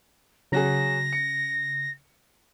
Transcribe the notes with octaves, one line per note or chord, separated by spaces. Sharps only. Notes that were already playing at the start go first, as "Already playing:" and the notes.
C#3 F#3 F#4 G#4 A#6
C#7